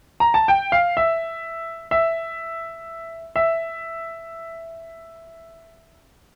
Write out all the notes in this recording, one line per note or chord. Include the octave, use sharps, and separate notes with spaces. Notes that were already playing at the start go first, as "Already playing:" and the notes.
A#5
A5
G5
F5
E5
E5
E5